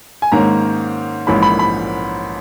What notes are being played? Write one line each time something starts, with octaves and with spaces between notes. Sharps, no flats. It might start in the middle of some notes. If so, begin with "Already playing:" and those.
G#5
G#2 D#3 A#3 C#4 A#5
A#1 G#2 E3 A#3 C#4 B5
B5
B5